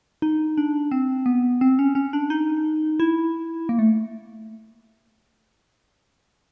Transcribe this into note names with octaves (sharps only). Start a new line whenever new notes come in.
D#4
D4
C4
B3
C4
C#4
C#4
D4
D#4
E4
A#3
A3